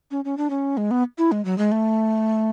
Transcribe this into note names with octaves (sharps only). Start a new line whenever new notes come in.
C#4
C#4
D4
C#4
G#3
B3
E4
G#3
F#3
G#3
A3